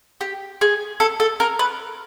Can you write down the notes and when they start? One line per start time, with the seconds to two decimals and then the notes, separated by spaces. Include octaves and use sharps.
0.21 G4
0.61 G#4
1.00 A4
1.20 A4
1.40 A#4
1.59 B4